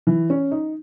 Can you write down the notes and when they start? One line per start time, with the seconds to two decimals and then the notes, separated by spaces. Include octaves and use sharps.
0.07 E3
0.30 C#4
0.52 D#4